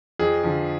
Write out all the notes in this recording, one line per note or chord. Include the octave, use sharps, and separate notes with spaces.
F2 G#4
D3 F3